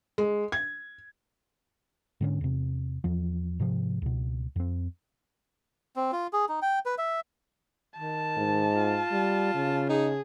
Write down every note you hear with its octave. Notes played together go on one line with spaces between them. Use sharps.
G#3
G#6
G#2 D3 C#4
E2 C3
E2 F3
G#2 C3 F3
C#2 B2
F2 C4
C4
F4
G#4
D#4
G5
B4
E5
D#3 A5
G#2
F4
G3
C#3
D#4 G#4